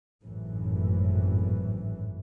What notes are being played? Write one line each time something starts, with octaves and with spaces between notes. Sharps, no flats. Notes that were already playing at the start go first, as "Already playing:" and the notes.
G#1 F#2 A2 E3